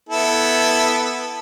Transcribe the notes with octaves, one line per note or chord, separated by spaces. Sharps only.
B3 E4 A4